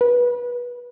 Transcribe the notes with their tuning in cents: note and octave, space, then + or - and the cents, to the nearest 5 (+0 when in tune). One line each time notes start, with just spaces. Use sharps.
B4 -25